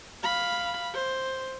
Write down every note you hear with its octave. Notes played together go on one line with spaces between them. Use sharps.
F5 B5
C5